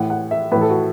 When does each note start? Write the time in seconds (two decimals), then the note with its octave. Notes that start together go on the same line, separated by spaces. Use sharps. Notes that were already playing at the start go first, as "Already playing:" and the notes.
Already playing: A2 E3 F#5
0.10 F#5
0.31 E5
0.52 A2 E3 B4
0.61 A4
0.70 F#4